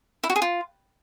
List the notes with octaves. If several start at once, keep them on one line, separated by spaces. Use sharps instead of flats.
E4
F#4
G#4
F4